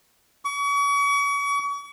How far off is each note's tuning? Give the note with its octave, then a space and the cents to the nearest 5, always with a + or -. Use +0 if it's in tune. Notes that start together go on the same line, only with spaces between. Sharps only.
C#6 +40